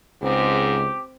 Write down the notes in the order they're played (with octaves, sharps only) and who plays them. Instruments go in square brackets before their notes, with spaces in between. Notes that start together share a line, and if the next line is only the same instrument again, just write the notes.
[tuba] C#2 [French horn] G#2 [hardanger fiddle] C4 [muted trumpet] G4